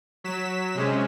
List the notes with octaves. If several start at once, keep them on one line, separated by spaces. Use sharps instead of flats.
F#3 B6 E7
C3 G#3 C#4